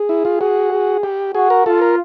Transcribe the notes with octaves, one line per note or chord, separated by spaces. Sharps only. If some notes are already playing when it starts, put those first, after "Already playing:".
Already playing: G#4
E4
F4
F#4 G#4
G#4
G4
F#4 G#4
A#4
F4 A4
A#4